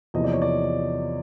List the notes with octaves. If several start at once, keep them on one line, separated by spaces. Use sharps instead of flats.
E2 C3 F3 A#3 D#5
D5
C#5
D5